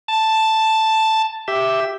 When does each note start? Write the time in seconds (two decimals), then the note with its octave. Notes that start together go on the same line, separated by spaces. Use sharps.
0.08 A5
1.48 G4 E5